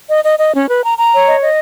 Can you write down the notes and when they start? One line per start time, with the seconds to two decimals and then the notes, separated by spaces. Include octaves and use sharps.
0.09 D#5
0.24 D#5
0.37 D#5
0.53 C#4
0.68 B4
0.82 A#5
0.96 A#5
1.12 C#5
1.26 D#5
1.41 D#5